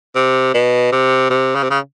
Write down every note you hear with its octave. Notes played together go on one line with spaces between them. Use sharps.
C3
B2
C3
C3
C#3
C3
C#3